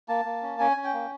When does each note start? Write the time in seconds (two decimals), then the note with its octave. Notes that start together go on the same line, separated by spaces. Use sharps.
0.09 A#3 A5
0.25 A#3
0.42 C#4
0.59 C#4 G#5
0.77 C#4
0.84 G5
0.93 A#3